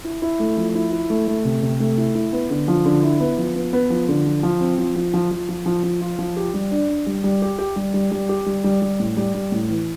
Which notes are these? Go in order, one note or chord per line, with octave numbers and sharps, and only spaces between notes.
E4
E4
A3
F3
E4
E4
A3
A3
C3
C3
A3
E4
E4
B3
D3
F3
D3
E4
B3
F3
B3
B3
F3
D3
F3
F3
C4
F3
F3
F3
F3
F3
F3
F3
F4
F3
G4
G3
D4
D4
G3
G3
G4
G4
G3
G3
G3
G4
G3
G3
G3
A2
G3
G3
A2
E3